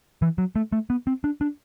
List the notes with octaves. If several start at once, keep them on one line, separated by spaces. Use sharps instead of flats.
E3
F#3
A3
A3
B3
C4
D4
D4